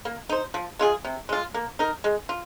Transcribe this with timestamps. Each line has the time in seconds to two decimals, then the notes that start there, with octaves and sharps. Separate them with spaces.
0.05 A#3
0.29 D#4 C5
0.54 F3
0.79 G#3 F4 G#4
1.05 C3
1.29 G#3 F4
1.54 A#3
1.79 D#4 A#4
2.04 G#3
2.29 F4